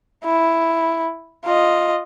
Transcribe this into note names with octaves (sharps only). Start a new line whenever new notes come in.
E4
F4 D#5